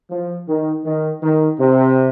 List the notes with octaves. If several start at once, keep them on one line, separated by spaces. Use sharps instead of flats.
F3
D#3
D#3
D#3
C3